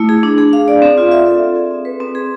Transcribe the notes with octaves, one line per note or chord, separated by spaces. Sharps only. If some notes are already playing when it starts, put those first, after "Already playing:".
Already playing: A3 E4
G#4
D4
G#4
F5
D5
C4
F4
E5
A4
C4
G#4
C4
B4
C4
G#4